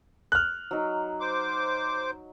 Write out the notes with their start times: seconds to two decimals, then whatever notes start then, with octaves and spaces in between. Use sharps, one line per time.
0.32 F6 F#6
0.71 F#3 D#4
1.20 C5 D6